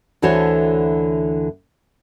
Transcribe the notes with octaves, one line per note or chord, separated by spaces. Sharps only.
D2 D3 E3 F#4 C5 C#5